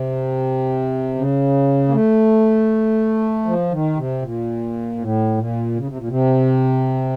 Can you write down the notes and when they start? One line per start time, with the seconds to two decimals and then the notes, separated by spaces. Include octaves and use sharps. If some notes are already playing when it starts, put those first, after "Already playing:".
Already playing: C3
1.15 C#3
1.88 A#3
1.93 A3
3.46 F3
3.71 D#3
3.97 C3
4.22 A#2
4.99 A2
5.38 A#2
5.77 C#3
5.87 C3
5.98 A#2
6.09 C3